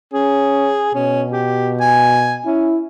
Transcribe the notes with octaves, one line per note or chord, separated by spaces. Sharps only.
C#4 G#4
B2 C#4
G4
G#5
C#4 E4